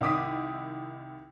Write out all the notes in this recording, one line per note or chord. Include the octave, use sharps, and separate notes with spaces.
C2 D#3 E4 D6 D#6 B6